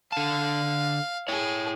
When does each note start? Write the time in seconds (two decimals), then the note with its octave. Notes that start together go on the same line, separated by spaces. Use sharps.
0.12 D3 F5 A5
1.28 E4 G#4 C#5